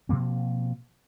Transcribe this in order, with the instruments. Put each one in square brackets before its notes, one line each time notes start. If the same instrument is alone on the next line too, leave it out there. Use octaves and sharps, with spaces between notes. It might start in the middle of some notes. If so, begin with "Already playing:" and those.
[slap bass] B2 F3 A#3 C4